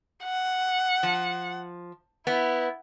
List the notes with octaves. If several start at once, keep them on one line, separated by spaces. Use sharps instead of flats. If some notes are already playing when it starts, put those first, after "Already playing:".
F#5
F3
B3 E4